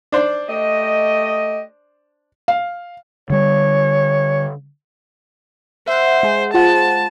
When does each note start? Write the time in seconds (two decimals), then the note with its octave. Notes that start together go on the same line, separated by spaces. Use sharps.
0.12 D4 C5 D5
0.49 A3 G4 D#5
2.48 F5
3.30 D3 G3 C#5
5.87 C5 E5 F#5
6.23 G#3 G#4
6.54 F4 C5 F#5 A5